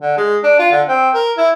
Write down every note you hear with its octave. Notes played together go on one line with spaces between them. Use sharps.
D3
G#3
D4
F4
D3
C4
A#4
E4